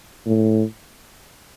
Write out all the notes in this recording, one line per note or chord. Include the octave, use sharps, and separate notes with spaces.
A2